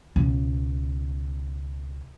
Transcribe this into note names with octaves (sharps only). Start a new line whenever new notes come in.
C#2 B2